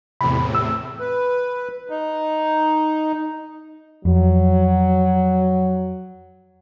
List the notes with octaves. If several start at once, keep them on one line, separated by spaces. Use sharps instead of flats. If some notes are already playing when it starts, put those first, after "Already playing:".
E2 A2 C3 B5
E6
B4
D#4
F2 F#3